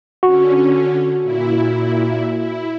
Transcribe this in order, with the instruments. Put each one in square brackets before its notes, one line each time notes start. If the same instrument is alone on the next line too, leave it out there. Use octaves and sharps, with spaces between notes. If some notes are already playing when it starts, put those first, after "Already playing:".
[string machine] D3 C#4 [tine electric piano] F#4
[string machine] A#2 E4
E4